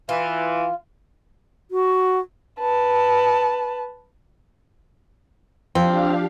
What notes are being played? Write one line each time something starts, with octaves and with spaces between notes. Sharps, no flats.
E3 F4
F#4
B4 A5
F3 C4 D4 G4 F5